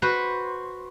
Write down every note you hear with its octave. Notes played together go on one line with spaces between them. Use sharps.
F#4 B4 C5